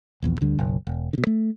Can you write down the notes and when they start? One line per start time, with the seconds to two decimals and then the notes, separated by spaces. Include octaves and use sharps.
0.22 D#1 A#1 E2
0.41 D2 D3 G3
0.59 F#1 B1
0.87 E1
1.13 B2 D3
1.27 A3